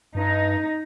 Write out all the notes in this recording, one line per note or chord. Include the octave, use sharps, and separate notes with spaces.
G2 D#4